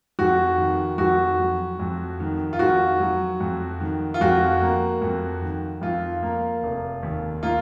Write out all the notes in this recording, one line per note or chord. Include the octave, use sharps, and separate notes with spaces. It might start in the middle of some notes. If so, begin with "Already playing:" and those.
F2 F#4
D#3
F2 F#4
F#3
F2
D#3
F4
F2 F#4
F#3
F2
D#3
F4
F2 F#4
A#3
F2
D#3
F2 F4
A#3
F1
D#2
A#3 F4